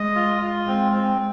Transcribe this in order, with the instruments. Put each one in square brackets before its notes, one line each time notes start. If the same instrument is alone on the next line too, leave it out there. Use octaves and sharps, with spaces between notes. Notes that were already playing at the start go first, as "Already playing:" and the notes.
Already playing: [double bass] G#3 [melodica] D#5
[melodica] F4
F4
[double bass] G#3 [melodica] C4
[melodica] C4